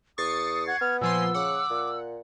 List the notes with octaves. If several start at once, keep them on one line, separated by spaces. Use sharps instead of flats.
E2 C#6 D#6 A6 C7
F#5 G#6
B3 F6
A#2 F3 G#5 C6 E6
C#3 F#5 D6
A#2